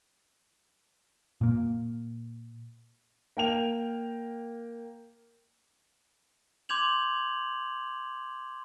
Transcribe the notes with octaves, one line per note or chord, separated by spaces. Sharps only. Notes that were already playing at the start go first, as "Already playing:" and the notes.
A#2 A#3
A#3 G5 F7
C6 D6 G6 G#6 F7 F#7